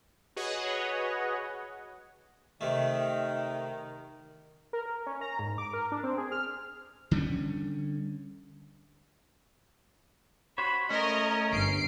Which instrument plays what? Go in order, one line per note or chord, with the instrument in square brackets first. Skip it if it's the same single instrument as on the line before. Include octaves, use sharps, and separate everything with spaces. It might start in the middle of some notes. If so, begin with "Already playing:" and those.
[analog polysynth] F#4 G#4 B4 C#5 D#5 F#5
[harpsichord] C3 A3 [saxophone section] D#3
[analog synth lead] A#4
A#4
C#4
A#5
G#2
D6
A#4
D4
C4
G#4
F6
[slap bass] D3 G3 C4 C#4
[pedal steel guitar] F#4 C5 C#5 [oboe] B5
[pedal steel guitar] A3 [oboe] C#4 [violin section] A#4 D#5
[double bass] G1 G2 [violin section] C7 D7